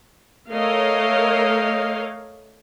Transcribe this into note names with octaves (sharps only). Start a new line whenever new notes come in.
A3 A#4 C#5 D#5 F5